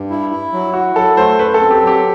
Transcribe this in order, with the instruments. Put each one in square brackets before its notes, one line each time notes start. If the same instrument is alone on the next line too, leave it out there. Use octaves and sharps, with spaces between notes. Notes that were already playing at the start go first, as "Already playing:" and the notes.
Already playing: [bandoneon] G2
E4
E4
F#3
[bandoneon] E4 [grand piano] F#4
[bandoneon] F#3 [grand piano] A4
[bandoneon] A3 [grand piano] C5
[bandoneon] F#2 [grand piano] B4
[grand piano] A4
[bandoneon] C4
[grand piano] G4
[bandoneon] F#3
[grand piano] G4